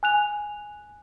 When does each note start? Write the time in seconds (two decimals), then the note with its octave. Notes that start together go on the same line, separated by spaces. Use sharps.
0.03 G#5 F#6 F7